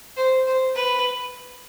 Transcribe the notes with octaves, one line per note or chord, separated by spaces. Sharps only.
C5
C5
B4